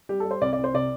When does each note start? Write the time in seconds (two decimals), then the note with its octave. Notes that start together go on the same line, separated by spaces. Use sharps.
0.09 G3 G4
0.20 G3 A4
0.31 C5
0.42 C2 D5
0.53 D5
0.58 C2
0.64 C5
0.74 C3 D5